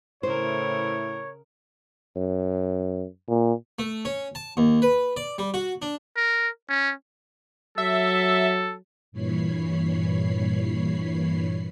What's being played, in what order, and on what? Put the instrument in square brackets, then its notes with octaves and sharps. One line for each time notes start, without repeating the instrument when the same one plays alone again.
[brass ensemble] A2 E4 [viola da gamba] C#3 A#4 [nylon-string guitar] C5 [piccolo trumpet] C#5
[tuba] F#2
[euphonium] A#2
[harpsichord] A3
C#4
A5
D#2
B4
D5
G3
F#4
D4
[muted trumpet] A#4
C#4
[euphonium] F#3 [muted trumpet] A4 [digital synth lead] E5
[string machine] G2 A#2 E3 C#5 B5 C7